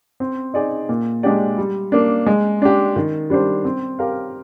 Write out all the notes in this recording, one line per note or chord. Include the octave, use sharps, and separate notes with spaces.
C4
D#4 G#4 D5
A#2
G#3 D4 G4 D5
G3
A#3 D4
G#3
D4 G4
D#3
G3 D4 G4 C5
C4
G4 A#4 F5